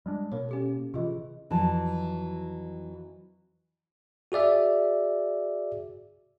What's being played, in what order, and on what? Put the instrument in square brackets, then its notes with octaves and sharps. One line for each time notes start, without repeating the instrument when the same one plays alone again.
[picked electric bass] G3 G#3 D4
[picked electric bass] B2 A#3 [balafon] A#4 C#5
[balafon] C#4 G4 A4
[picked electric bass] C3 E3 [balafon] F4 G#4 D#5
[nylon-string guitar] F2 E3 F#3 A5
[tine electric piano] F#4 G#4 D5 E5